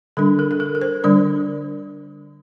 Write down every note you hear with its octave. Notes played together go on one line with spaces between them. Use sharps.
D3 G3 D4 A4
A#4
A4
A#4
A#4
C5
D3 G3 D4 D5